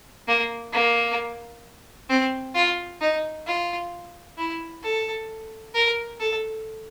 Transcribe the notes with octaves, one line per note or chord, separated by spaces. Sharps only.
A#3
A#3
C4
F4
D#4
F4
E4
A4
A#4
A4